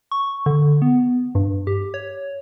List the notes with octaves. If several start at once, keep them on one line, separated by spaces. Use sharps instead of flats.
C#6
D3
B3
G2
G4
C#5